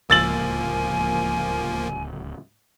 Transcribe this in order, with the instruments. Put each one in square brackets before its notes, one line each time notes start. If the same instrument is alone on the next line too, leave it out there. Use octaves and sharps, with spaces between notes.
[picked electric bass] D1 C#2 [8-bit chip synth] F3 A#3 [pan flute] G#5 [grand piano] E6 A6 F#7